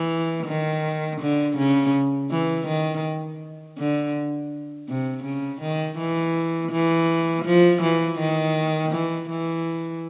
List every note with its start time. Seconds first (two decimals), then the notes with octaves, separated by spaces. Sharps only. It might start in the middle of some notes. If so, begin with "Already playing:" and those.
Already playing: E3
0.46 D#3
1.21 D3
1.57 C#3
2.31 E3
2.68 D#3
3.78 D3
4.88 C3
5.24 C#3
5.62 D#3
5.98 E3
6.72 E3
7.45 F3
7.82 E3
8.19 D#3
8.92 E3
9.29 E3